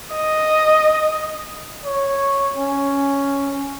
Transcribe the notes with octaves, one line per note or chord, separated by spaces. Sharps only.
D#5
C#5
C#4